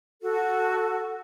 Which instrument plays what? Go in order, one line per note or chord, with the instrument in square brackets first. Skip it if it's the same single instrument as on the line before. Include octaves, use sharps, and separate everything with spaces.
[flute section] F#4 A4